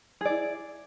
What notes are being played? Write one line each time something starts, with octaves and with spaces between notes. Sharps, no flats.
E4 G#4 D5